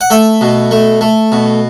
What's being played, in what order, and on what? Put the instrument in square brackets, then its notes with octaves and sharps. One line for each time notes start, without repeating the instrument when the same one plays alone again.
[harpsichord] F#5
A3 E5
B2
A3
A3
B2